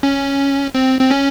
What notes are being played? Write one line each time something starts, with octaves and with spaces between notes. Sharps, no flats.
C#4
C4
C4
C#4